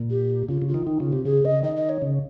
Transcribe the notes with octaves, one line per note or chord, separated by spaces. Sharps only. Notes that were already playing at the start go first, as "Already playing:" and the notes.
Already playing: A#2
G4
C#3 F4
C#3
F4
D#3
D#3 D#4
C#3 F4
C3 G4
C#3 G#4
C#3 D#5
D#3 D#5
D#5
C#5
C#3